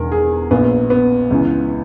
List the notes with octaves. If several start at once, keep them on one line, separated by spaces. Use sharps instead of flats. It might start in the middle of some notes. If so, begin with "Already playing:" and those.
Already playing: E1 E2 D#3 A#4
G#4
A#1 A#2 B3
B3
C#2 C#3 E3